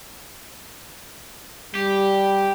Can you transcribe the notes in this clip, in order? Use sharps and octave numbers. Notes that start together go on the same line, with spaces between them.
G3 G4